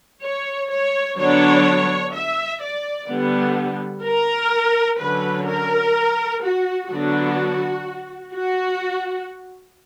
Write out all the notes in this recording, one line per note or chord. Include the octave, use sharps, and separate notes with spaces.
C#5
C#5
D3 F#3 B3 D4 C#5
E5
D5
D3 G3 B3
A#4
D3 F#3 C#4 B4
A#4
F#4
D3 F#3 B3 D4 F#4
F#4